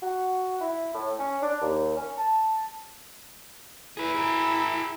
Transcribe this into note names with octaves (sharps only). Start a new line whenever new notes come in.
F#4
E4
A2
C#4
D4
D#2
C#4
A5
E4 G#4 B4
G#4 A#4